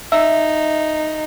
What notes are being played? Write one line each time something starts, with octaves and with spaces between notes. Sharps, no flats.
D#4 E5